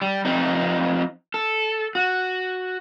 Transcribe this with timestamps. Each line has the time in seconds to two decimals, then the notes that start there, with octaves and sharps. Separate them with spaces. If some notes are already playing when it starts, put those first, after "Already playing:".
0.02 G3
0.25 F2 C4 D#4
1.34 A4
1.95 F#4